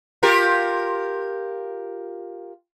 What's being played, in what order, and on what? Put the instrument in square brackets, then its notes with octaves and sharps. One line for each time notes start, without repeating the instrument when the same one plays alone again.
[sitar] F4 G4 A#4